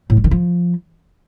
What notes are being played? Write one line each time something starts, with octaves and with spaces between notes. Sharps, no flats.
A2
G3
D#3
F3